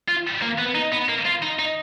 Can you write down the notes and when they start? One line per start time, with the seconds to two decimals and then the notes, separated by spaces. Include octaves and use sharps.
0.08 F4
0.42 A#3
0.58 B3
0.75 D#4
0.92 B3
1.09 A#3
1.26 F4
1.42 D#4
1.59 D#4